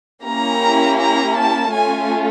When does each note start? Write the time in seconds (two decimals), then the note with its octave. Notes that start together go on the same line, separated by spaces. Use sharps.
0.23 A#3 C#4 E4 G4 A#5
0.99 A#5
1.35 A5
1.73 A3 C#4 F4 A4 G#5